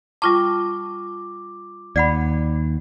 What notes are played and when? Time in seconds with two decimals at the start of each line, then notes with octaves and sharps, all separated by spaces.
0.22 G3 F4 A5 C#6 D6
1.96 D#2 D5 F#5 B5